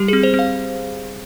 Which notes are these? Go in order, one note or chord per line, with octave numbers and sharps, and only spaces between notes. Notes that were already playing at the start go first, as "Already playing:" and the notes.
Already playing: G3 G4
C4 G#4
C5
C4
F5